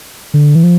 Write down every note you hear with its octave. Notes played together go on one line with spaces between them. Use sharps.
D3
E3
F3